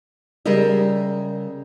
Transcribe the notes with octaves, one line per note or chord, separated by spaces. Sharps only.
C#3 G3 G#4 A#4 D#5 E5